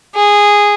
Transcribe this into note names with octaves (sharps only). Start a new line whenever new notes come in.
G#4